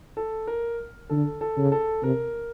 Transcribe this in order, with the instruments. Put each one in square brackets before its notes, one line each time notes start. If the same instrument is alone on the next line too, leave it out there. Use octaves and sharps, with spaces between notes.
[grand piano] A4
A#4
[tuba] D3 [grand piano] A4
[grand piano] A4
[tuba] C#3
[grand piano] A4
[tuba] C3 [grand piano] A#4